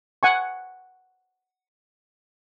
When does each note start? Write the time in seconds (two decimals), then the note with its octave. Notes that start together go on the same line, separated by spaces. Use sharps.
0.23 F#5 G#5 C#6